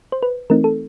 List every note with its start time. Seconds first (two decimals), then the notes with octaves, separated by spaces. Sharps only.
0.12 C5
0.23 B4
0.50 E3 A3 C4 D#4 A#4
0.64 A4